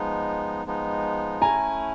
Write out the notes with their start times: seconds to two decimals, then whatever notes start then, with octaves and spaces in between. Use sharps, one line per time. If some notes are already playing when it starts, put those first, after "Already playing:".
Already playing: F3 G#3 B3 D#4
0.66 F3 G#3 B3 D#4
1.42 A3 C#4 E4 G#5 A#5